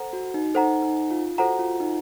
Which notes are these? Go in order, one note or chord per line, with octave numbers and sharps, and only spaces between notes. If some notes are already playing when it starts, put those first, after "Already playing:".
Already playing: A4 C5 F#5 A#5
F#4
D#4
D#4 A4 C5 F#5 A#5
D#4
F4
F#4 A4 C5 F#5 A#5
F4
D#4